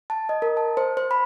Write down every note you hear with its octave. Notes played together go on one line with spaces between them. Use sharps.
A5
D#5
A#4
A5
C5
C5
B5